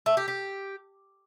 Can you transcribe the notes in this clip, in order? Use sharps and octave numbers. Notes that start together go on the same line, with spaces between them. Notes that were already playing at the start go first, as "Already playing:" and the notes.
A3
G4
G4